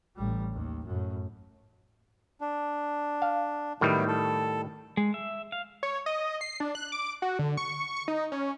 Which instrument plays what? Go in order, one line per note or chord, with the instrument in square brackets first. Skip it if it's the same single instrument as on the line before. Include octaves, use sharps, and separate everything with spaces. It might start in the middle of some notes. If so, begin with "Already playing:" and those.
[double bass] A1 G3
D#2
F#2 A2
[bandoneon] D4
[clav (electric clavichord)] F5
[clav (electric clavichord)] A2 D#3 G3 [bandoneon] F#3 B3 E4
[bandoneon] A4
[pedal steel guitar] G#3
E5
F5
[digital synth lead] C#5
D#5
C7
D4
F#6
D6
F#4
D3
C#6
C#6
D#4
C#4